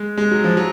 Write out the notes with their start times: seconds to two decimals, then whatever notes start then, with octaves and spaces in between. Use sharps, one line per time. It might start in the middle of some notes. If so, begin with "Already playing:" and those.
Already playing: G#3
0.17 G#3
0.31 F#3
0.44 F3
0.57 F#3